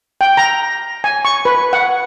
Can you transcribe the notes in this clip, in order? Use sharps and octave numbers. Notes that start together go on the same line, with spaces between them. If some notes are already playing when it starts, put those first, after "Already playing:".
G5
A#5
G#5
C#6
B4
F#5